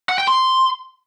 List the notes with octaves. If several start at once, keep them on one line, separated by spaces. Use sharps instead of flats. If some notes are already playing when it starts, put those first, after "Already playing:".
F#5
G5
C6